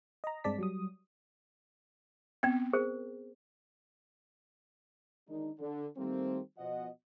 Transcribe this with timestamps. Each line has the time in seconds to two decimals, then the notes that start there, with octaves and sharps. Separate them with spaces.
0.24 D#5 A#5
0.44 G2 G#3 C4 D5 A5 B6
0.58 F#3 G3 D#6
2.43 B3 C4 G5
2.73 G#4 A#4 C5
5.28 D#3 G#3 D4 D#4
5.59 D3
5.97 D#3 G3 A3 A#3 C4
6.58 B2 F3 D#5 F#5